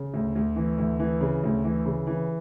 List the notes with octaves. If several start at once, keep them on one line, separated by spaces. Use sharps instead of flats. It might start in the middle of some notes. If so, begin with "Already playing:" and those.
Already playing: C#3
D2
D2
E3
D2
E3
C#3
D2
E3
C#3
E3